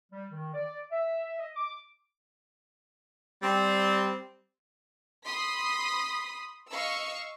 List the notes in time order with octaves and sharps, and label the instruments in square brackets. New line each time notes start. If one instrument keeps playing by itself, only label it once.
[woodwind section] G3
D#3
D5
E5
D#5
D6
[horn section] G3 C4
[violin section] B5 C6 D#6 B6
D#5 F5 C#6 E6